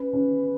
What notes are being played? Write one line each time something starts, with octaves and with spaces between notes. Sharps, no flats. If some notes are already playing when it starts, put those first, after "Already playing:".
Already playing: C#4 B4
C#4